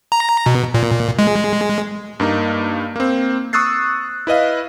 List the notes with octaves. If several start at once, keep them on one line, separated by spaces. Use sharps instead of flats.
A#5
B2
A#2
G#3
G2 A#3 D#4
A#3 C4
C#6 D#6 E6 F#6 A6 C7
E4 B4 D#5 F5